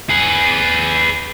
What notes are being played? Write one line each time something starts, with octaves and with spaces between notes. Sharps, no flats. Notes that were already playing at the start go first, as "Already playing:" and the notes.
G#4 B4